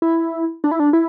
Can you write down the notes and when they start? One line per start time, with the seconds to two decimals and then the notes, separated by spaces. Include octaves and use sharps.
0.02 E4
0.64 D4
0.71 E4
0.80 D4
0.93 E4